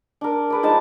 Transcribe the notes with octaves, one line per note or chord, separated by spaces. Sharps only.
D4 A#4
G#4 B4 D5
F3 G#3 D#4 A5